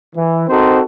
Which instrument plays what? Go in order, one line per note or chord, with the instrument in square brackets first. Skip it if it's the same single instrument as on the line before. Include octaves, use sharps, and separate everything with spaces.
[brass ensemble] E3
C4 D#4 F#4 A4 A#4 C5